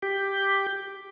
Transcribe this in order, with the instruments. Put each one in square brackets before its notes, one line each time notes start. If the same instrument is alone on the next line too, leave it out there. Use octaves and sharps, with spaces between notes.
[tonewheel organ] G4